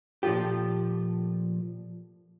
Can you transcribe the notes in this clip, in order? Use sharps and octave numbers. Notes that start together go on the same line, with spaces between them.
A#2 F3 A3 F4 G4